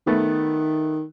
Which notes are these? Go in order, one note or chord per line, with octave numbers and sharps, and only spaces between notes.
D#3 A3 B3